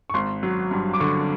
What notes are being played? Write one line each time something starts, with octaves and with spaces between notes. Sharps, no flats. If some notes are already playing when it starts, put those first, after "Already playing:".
C#6
G#1 C6
F#3
G2
D6
D3 C#6